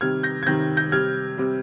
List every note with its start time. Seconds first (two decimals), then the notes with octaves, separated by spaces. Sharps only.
0.01 C3 D#3 G3 F6 G#6
0.23 G6 A#6
0.43 G#6
0.46 C3 D#3 G3 G6 A#6
0.77 G6 A#6
0.92 C3 G3 F6 G#6
1.38 C3 G3